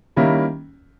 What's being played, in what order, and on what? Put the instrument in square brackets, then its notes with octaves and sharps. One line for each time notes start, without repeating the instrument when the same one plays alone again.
[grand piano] D#3 G3 A#3 C#4 E4